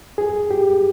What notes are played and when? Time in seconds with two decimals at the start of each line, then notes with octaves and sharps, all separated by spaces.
0.18 G#4
0.51 G4